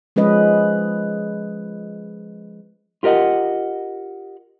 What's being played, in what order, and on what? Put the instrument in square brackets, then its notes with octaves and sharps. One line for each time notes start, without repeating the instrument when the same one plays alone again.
[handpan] F3 G#3 C#4 B4 D#5
[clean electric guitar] F4 G4 A#4 D#5 F#5